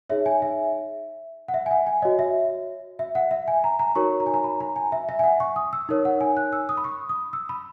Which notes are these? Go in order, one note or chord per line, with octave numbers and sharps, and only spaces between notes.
D#4 G#4 C#5 E5
G#5
E5
F#5
E5
G#5
F#5
G#5
F#4 C#5 D#5
E5
E5
F#5
E5
G#5
A#5
A#5
D#4 F#4 A#4 C#5 C#6
A#5
G#5
A#5
B5
A#5
G#5
E5
E5
G#5
F#5
C#6
D#6
E6
D#4 A#4 C#5
F#5
G#5
F#6
E6
D#6
B5
C#6
D#6
E6
B5